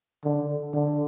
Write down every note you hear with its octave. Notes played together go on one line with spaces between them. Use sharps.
D3
D3